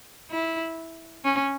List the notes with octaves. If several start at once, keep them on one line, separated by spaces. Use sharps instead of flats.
E4
C#4